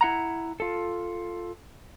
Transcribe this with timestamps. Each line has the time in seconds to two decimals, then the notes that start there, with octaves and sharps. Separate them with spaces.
0.01 E4 F#5 A#5
0.60 F4 A4